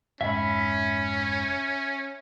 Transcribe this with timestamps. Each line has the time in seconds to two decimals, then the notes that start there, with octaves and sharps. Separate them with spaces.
0.21 F1 G#2 C#4 E5 B5